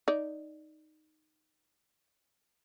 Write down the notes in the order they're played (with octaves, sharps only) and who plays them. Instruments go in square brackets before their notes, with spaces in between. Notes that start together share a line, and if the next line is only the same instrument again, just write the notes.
[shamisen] D#4 D5